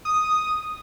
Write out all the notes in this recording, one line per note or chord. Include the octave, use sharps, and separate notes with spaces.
D#6